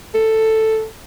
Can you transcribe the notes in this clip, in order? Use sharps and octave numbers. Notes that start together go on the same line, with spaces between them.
A4